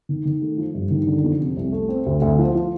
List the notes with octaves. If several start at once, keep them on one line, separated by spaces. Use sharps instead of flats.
D#3
D#3
A3
F3
G2
D#3
D3
F2
C3
C2
A3
C4
D2
D2
F3
F3